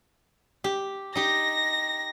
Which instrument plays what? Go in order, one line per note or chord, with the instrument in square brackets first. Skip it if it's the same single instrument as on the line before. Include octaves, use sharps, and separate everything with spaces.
[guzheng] G4
[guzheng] D#4 G4 [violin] A#6